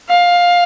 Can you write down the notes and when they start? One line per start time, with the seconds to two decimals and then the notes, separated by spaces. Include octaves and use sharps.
0.09 F5